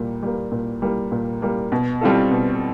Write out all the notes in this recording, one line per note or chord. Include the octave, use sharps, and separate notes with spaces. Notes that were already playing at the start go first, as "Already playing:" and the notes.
Already playing: A#2 G3 A#3
G3 A#3
A#2
G3 A#3
A#2
G3 A#3
B2
G3 C4 F4 A4
B2